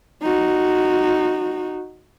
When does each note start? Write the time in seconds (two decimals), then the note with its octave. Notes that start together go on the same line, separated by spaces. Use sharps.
0.23 D#4 F#4